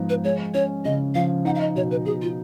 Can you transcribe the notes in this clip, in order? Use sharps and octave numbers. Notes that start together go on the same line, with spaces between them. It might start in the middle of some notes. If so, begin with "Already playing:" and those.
Already playing: G#2 F3 B3 D#4
B4
G#3 C#5
C#4 C#5
C#3 D#5
F3 F5
D#4 F#5
F5
D#5
B2 C#5
B4
B2 G#4
F4